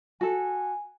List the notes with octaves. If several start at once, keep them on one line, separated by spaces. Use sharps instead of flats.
F#4 A4 G#5